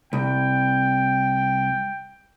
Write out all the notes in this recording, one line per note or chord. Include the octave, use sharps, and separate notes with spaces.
C2 G5